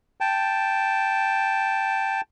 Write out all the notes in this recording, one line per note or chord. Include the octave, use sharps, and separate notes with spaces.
G5 A5